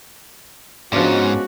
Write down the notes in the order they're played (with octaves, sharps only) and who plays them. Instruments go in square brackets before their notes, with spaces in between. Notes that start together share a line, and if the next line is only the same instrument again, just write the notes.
[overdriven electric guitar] G#2 [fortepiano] F3 D4 [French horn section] G#3 B3 C#4 [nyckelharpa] F#4